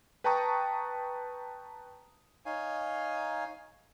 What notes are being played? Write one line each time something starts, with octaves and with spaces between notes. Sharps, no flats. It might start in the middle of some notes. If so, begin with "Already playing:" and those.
B4 G5 A5 A#5 C#6 D#6
D#4 C#5 F5 G#5